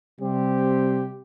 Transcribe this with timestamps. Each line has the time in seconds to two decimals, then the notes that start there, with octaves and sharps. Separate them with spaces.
0.21 C3 G3 C4 G4